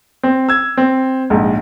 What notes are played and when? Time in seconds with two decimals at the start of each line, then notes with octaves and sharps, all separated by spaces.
0.23 C4
0.49 E6 G#6
0.77 C4
1.30 A#1 G#2